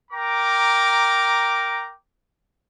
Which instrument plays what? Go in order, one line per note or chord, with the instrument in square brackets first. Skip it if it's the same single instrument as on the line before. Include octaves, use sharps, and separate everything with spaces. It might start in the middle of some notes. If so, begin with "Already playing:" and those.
[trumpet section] A#4 G5 A#5 D6